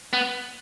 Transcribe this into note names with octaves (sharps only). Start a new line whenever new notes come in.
B3